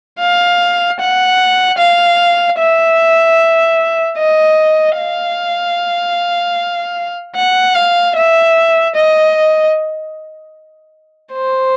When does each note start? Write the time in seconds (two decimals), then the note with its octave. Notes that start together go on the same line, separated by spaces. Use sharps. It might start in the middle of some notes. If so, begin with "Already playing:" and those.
0.20 F5
1.00 F#5
1.78 F5
2.58 E5
4.18 D#5
4.96 F5
7.35 F#5
7.75 F5
8.16 E5
8.95 D#5
11.33 C5